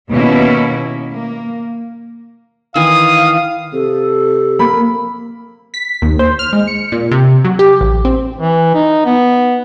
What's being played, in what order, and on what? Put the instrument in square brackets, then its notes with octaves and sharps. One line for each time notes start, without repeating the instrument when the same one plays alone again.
[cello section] D#2 B2 A#3 B3 C#4 E4
A#3
[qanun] D#3 E3 E4 [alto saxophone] F5 [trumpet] D#6
[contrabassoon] C3 [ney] A4
[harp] A#3 [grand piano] B5
[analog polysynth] B6
D#2
C5
F6
G#3
C#7
A#2
C3
F#3
G4
A1
C4
[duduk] E3
D#4
B3